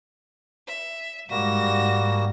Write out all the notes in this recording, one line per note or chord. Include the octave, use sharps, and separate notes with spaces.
E5
G#2 G3 A#3 F#4 A#6 E7